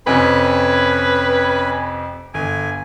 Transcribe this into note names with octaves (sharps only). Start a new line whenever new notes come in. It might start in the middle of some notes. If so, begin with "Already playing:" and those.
F2 C3 C#4 B4 G#5
G1 G#5